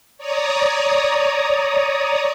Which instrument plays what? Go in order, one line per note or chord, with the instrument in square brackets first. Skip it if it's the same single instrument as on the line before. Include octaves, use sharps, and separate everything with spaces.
[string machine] C#5 D5 A#5 D#6